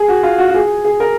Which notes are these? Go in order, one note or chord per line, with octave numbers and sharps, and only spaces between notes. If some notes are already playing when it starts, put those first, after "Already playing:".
Already playing: G#4
F#4
F4
F#4
F#4
G#4
G#4
A#4